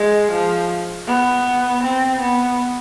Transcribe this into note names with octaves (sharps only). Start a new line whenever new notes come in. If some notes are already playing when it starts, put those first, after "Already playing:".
Already playing: G#3
F3
B3
C4
B3